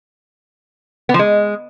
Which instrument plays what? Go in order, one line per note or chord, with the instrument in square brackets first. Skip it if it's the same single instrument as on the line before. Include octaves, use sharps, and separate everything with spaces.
[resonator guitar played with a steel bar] B3
F3
G#3